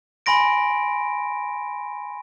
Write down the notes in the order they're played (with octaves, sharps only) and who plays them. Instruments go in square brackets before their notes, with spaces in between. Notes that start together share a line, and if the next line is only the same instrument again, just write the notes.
[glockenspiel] G#5 B5 C6 A#6 D7